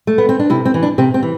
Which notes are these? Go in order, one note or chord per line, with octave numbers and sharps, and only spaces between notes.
A3
B3
C4
D4
C3 E4
C4
E3
D4
C3 C4
C4
E3